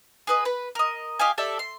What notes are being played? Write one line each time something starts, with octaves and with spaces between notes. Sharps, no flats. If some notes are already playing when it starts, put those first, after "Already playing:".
G#4 B4 D#5
B4 B5
A#4 D#5
G4 D#5 F5 G#5
G4 A4 D5 E5
C6